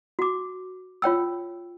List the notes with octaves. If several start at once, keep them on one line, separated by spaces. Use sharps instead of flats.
F#4 D6
F4 C#5 G5 E6